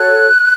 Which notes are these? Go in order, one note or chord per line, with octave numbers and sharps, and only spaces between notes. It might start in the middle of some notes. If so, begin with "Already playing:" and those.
Already playing: F#4 A4 C#5 F#6